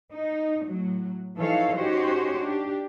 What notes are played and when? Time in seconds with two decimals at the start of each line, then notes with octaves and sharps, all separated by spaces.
0.13 D#4
0.65 A2 F#3
1.37 E3 F3 D#4 A4 C#5 F5
1.76 C#4 D#4 F#4 G4 C5 C#5
2.40 D4 G4